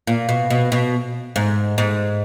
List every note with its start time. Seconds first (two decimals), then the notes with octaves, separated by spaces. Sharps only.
0.07 A#2
0.29 B2
0.50 B2
0.72 B2
1.36 G#2
1.78 G#2